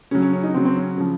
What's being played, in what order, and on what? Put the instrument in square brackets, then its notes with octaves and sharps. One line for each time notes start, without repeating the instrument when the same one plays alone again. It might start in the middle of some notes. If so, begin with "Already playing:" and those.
[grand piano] C#3 F#3 C#4
C#4
C#4
D#4
C#3 F#3 C4
C4
C#4
C#3 F3